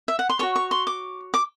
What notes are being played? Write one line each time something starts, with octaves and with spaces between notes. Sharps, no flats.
E5
F#5
C6
F#4 A4 C#5 C#6
C#6
C6
D6
D6